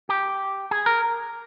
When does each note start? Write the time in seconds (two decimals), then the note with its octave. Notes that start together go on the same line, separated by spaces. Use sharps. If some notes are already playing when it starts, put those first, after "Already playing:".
0.09 G4
0.71 G#4
0.86 A#4